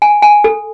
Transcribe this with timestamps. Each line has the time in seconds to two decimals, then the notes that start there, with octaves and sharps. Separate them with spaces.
0.02 G#5
0.22 G#5
0.44 A4